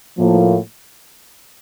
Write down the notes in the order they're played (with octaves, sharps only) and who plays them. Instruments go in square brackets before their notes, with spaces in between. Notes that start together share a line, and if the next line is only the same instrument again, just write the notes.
[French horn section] A2 F3 A#3